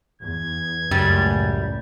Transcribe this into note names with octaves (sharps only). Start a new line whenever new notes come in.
E2 G#6
C#2 F#2 A2 G3